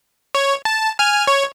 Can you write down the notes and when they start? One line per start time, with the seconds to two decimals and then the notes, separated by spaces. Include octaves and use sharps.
0.35 C#5
0.65 A5
0.99 G#5 F6
1.27 C#5